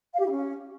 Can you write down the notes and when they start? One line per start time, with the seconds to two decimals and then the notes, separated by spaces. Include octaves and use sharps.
0.14 F5
0.19 G4
0.24 E4
0.30 C#4